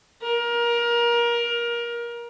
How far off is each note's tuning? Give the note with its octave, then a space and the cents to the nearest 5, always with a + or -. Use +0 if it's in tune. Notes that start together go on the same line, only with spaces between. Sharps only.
A#4 +25